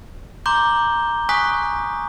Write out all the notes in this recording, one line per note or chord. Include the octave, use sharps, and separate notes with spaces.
A#5 C6 D6 G6 G7
G#5 C#6 D#6 F#6 B6